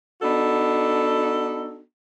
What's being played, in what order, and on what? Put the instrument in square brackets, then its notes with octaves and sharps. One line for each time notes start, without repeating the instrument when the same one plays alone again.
[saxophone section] B3 D4 D#4 F#4 A4